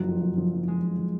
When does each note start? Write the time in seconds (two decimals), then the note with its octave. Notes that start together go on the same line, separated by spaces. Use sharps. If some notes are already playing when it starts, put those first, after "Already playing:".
Already playing: F#1 F3 F#3
0.08 F2
0.22 F#1
0.38 F3
0.53 F#1
0.68 F2 G#3
0.83 F#1
0.98 F3